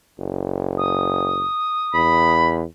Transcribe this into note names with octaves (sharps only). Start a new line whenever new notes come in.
F#1
D#6
E2 B5